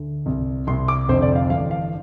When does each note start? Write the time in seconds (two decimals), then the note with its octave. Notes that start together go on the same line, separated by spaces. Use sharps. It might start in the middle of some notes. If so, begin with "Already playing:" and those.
Already playing: D2 D3
0.26 C2 C3
0.67 C2 C3 C6
0.88 D6
1.08 F1 F2 D3 C5
1.22 D5
1.36 F5
1.50 A1 G2 D3 F5
1.71 F5